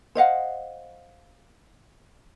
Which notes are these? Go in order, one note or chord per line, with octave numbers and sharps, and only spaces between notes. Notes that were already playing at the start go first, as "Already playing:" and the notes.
C5 D#5 F5 F#5